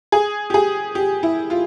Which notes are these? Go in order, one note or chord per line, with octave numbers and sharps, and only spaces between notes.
G#4
G4
G#4
G4
E4
F4